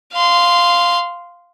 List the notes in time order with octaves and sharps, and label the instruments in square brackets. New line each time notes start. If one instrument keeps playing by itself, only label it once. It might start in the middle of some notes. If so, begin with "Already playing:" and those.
[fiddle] F5 C6